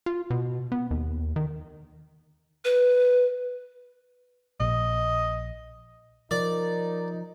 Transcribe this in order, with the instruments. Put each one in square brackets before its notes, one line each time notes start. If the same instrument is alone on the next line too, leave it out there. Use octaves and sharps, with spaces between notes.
[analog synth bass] F4
B2
B3
D#2
D#3
[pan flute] B4
[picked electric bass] A#1 [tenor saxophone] D#5
[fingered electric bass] F3 [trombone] D#4 [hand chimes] A#4 [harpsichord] D5